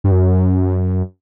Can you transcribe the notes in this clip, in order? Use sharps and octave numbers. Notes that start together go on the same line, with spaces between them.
G2
F#2